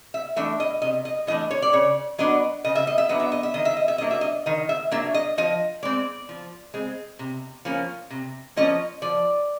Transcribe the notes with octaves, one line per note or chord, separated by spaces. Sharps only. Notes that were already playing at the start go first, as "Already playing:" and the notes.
E5
E3 A3 D4 E5
D#5
C3 D#5
D#5
E3 A3 D4 D#5
C#5
D5
C#3 C#5
F#3 B3 D4 D#5
C#3 D#5
E5
D#5
E5
F#3 B3 D4 D#5
E5
D#5
E5
D#3 D#5
E5
D#5
E5
F#3 A#3 D4 D#5
E5
D#5
D#3 D#5
E5
F#3 A#3 D4 E5
D#5
F3 D#5
G#3 C4 D5
F3
G#3 C4
C3
F3 A#3 C#4
C3
F3 A#3 C#4 D#5
F3 D5